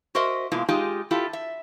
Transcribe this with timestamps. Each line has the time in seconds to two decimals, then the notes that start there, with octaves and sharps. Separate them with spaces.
0.15 F#4 A#4 C5 D#5 E5
0.52 B2 G#3 A#3 E4 F4
0.69 G#3 D#4 F4 G4 G#4
1.11 E4 F4 G4 A4
1.33 E5